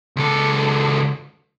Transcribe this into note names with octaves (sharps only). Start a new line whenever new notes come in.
C#2 A4